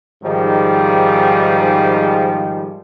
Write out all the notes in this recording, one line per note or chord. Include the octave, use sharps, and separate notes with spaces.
G#2 D#3 F3 G3 G#3